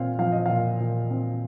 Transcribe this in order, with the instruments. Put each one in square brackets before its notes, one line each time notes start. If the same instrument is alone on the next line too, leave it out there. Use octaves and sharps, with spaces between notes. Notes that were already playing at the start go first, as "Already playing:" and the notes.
Already playing: [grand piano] A#2 C4 F5
F3 F5
D#5
A#2 F5
A#2
C4